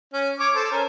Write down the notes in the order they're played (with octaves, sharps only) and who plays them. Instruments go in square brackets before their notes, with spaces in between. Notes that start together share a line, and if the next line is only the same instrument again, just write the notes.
[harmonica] C#4
C#5 D6
A4 C5
C#4 A#4